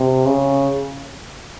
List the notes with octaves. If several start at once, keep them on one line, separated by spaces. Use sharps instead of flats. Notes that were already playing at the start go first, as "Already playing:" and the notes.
Already playing: C3
C#3